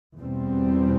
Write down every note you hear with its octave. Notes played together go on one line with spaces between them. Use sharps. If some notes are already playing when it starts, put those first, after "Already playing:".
E2 B2 G3 C4